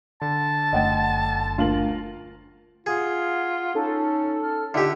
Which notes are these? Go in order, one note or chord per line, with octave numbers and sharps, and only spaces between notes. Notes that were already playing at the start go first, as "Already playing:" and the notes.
D3 A5
F#1 A3 D#5 F#5 G5
D2 F4 A#4 F5 F#7
F4 G#4 F#5
C#4 D#4 A4
F6
D3 D#4 F4 G4 E5